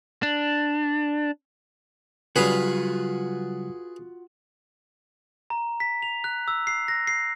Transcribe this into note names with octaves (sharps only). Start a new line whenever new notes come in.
D4
C#3 F#3 G3 F4 F#4 G#4 B4
A#5
B6
F7
F#6
E6
C7
A#6
C7